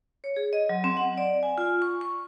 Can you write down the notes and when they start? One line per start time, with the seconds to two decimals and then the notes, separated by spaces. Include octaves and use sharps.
0.24 C#5
0.36 G#4
0.53 D#5
0.69 F#3
0.84 C4
0.97 F#5
1.18 D5
1.43 G#5
1.58 F4
1.82 C#6
2.01 C#6